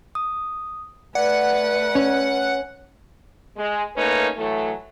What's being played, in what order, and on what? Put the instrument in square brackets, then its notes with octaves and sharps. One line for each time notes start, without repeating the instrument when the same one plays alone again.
[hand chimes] D#6
[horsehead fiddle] A3 B4 [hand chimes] D5 [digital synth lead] F#5
[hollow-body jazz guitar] C#4
[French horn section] G#3
A3 A#3 C#4 D#4 B4
A2 E3 F#3 A3